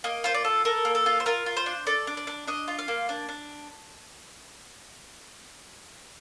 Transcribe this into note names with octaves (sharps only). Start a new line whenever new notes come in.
A#3 D#5
F4 C5
D5
A4
A4 A#4
A#3
A4
F4
C5
F4 A#4
F4
C5
D4
A4 D5
D4
D5
D4
D4 D#5
F4
F5
A#3
D4
D4